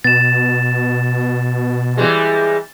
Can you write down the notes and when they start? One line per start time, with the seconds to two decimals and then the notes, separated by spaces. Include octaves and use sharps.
0.04 B2 A6 E7
1.97 E3 G3 G#3